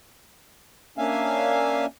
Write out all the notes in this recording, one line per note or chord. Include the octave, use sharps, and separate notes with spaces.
A#3 C#4 D4 E5 F5 G#5